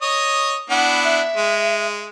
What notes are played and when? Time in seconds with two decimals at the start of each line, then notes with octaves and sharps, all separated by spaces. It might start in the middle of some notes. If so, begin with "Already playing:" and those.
0.02 C#5 D#5 D#6
0.70 B3 D4 E4 F#5
1.04 E5
1.37 G#3